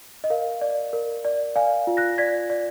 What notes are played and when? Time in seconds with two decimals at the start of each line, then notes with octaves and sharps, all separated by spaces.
0.24 D#5
0.30 A#4 F5
0.61 D5
0.93 A#4
1.25 D5
1.56 D5 F5 G#5
1.87 F4
1.97 F#6 A#6
2.18 D5 G#6 B6
2.50 D5